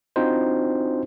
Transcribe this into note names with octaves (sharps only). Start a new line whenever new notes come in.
C4 D4 D#4 F4 F#4 C5